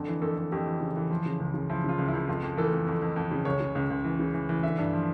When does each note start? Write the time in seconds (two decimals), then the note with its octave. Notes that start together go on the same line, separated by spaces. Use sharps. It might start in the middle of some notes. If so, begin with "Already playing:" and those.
Already playing: F2 D3
0.08 E3
0.22 F2 A4
0.37 F2
0.52 F2 G4
0.67 E3
0.81 C#3
0.96 E3
1.10 F3
1.26 C#3
1.40 C#2
1.54 C#3
1.70 F3 E4
1.84 C#3 F4
1.98 C#2
2.08 E4
2.14 C#2
2.28 F2 F4
2.43 F2
2.57 E3 A4
2.73 F2
2.87 F2
3.02 F2
3.16 F2
3.31 C#3
3.45 C#2 C#5
3.60 C#3
3.75 C#2
3.90 C#2
4.05 E3
4.20 C#3
4.34 E3
4.49 E3
4.63 D3 E5
4.78 G2
4.93 F3